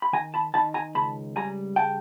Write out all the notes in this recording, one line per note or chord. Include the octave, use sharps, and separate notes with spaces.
B5
D#3 G#5 A#5
A5 B5
D#3 A5 B5
G#5 A#5
C#2 A5 B5
G3 G#5 A#5
C#3 G5 A5